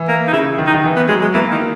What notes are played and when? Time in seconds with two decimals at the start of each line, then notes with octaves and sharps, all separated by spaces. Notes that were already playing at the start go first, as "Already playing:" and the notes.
Already playing: E3
0.08 A#3
0.27 D#4
0.33 C#3 E4
0.58 D#3
0.67 D#4
0.74 D#3
0.84 E3
0.96 B3
1.08 F#3 G#3
1.21 G#3
1.34 E3 A#3
1.51 D#3